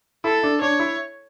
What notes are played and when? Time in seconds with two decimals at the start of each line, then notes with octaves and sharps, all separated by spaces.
0.24 E4 A4
0.43 D4
0.61 D4 C#5
0.79 E4